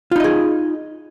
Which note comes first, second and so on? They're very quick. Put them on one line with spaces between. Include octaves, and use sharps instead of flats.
F4 D#4 D#5 G#4